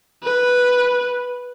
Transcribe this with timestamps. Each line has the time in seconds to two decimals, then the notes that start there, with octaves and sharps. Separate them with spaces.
0.23 B4